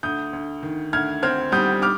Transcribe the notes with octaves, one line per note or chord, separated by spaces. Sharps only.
D2 D#6 G6
D2
D#3
D2 F6 G#6
C4 F6 G#6
G3 D#6 G6
D6 F6